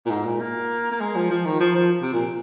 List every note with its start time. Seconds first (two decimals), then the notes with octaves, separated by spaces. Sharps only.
0.06 A#2
0.10 G#2
0.25 A#2
0.40 A#3
0.92 A#3
1.01 G#3
1.15 F3
1.30 F3
1.45 D#3
1.60 F3
1.75 F3
2.02 C3
2.13 A#2